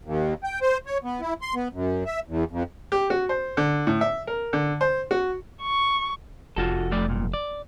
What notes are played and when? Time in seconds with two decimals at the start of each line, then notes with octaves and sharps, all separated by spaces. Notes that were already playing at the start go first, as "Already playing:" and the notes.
0.04 D#2
0.44 G5
0.61 C5
0.86 C#5
1.04 B3
1.21 E4
1.42 C6
1.55 B3
1.73 F#2
2.05 E5
2.28 E2
2.51 F2
2.92 G4
3.10 F#4
3.29 C5
3.57 D3
3.87 A2
4.01 E5
4.27 A#4
4.53 D3
4.81 C5
5.11 F#4
5.62 C#6
6.56 F1 F4 F#4 A4
6.91 F3 A3 D5
7.07 B1 G2 A#2
7.33 D5